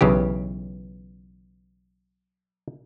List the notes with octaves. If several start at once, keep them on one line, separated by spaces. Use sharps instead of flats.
B1 C#3 E3 G4